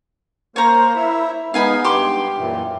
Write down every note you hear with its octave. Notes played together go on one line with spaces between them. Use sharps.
A#3 A#4 C5 C#5 A#5
E4 E5
G#3 B3 D#4 F5 G#5 B5
G2 G4 C6 D6
F#2 A#2 E3